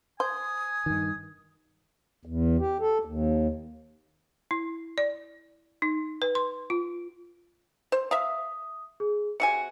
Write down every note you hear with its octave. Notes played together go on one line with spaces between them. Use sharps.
C5 G#5 D#6
G2 D#3
E2
G4
A4
D#2
E4
D5
D#4
B4
C6
F4
C5
E5 F5 D#6
G#4
C3 F#4 G#5 C#7